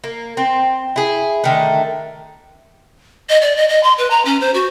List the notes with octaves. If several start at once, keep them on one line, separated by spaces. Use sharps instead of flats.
A#3
C4
E4 G#4
D3 D#3 A3
D#5
D5
D#5
D#5
C6
B4
A#5
C#4
C5
F#4